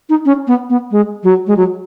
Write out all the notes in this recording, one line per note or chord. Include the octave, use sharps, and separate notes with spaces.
D#4
C#4
B3
B3
G#3
F#3
G#3
F#3